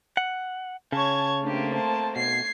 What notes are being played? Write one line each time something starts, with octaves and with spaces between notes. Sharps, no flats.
F#5
C#3 C#5 A5 C#6 G#6
A3 A#3 C4 D4 G4
C5 A5
B2 G#6 C7